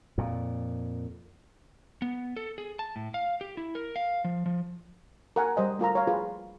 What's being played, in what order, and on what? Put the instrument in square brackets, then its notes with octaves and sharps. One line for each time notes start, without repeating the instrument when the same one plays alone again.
[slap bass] F2 A#2
[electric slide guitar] B3
A4
G#4
A5
A2
F5
G4
E4
A#4
F5
F3
F3
[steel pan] A#4 F#5 G#5
G3 C5 D#5 G#5
A3 F4 A#4 A#5
C#5 F5
F4 G#4 B4